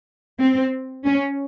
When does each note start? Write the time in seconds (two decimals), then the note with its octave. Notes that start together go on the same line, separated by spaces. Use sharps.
0.39 C4
1.05 C#4